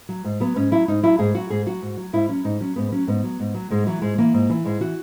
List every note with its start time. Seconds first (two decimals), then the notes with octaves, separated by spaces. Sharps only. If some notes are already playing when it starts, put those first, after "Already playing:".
0.09 F#3
0.25 G#2
0.40 F#3 B3
0.55 G#2 C#4
0.71 F#3 E4
0.88 G#2 D#4
1.03 F#3 E4
1.19 G#2 G#4
1.35 F#3 F#4
1.50 G#2 G#4
1.66 F#3 F#4
1.82 G#2
1.97 F#3
2.13 G#2 E4
2.29 F#3 C#4
2.44 G#2 D#4
2.61 F#3 C#4
2.76 G#2 B3
2.92 F#3 C#4
3.07 G#2 B3
3.24 F#3
3.40 G#2
3.54 F#3
3.70 G#2 G#3
3.87 E3 F#3
4.02 G#2 G#3
4.18 E3 A#3
4.34 G#2
4.50 E3
4.65 G#2 G#3
4.80 E3 F#4